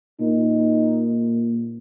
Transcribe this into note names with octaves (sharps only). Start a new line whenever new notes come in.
A#2 D#4